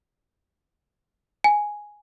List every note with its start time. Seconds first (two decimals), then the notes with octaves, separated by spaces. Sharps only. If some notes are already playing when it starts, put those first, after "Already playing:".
1.44 G#5